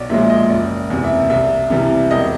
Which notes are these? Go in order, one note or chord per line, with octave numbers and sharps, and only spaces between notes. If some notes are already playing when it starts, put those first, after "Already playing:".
Already playing: B1 C#5 D5
A#2 F3 G#3 E5
D#5
F#1 D5
E2 C3
E5
C2 E5
C3 E3 G3
E1 D#5